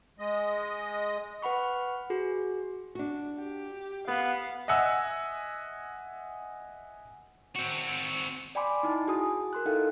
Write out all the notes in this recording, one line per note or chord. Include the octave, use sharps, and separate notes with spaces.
G#3 D#5
B4 F#5 B5 C#6
F#4 G#4
D4 F#4
G4
B3 G4 B4 F5
D#5 E5 F#5 G#5 E6
C4 F#4
D5 G5 G#5 B5 C6 D6
D#4 E4 A5
F#4 G#4 G#5 D#6
A#4 C6 F#6
D#4 E4 A4 F5 G5